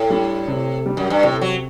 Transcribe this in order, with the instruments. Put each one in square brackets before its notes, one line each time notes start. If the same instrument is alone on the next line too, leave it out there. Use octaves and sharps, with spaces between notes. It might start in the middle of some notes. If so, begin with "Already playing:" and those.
Already playing: [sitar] A2
[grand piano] G3 D4
C3
G3 D4
[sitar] F#2
G2
[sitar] A2 [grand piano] C3
[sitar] F#3